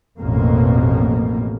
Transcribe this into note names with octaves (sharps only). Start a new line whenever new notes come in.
A1 F2 B2 A#3